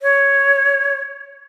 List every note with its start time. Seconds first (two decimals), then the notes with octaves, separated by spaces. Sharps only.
0.02 C#5